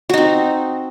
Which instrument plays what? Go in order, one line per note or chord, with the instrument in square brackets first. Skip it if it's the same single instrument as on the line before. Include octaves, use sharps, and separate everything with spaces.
[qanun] F#4
D#4
C4